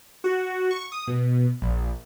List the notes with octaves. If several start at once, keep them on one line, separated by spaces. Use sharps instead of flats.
F#4
C#6
D#6
B2
A#1